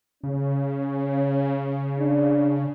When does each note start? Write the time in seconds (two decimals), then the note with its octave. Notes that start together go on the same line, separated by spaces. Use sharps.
0.23 C#3 C#4
1.99 D4